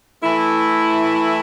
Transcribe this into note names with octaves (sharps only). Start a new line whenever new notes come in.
E3 A3 E4